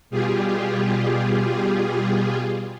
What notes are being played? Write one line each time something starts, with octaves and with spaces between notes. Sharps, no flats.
B2 G3 F4 G4 G#4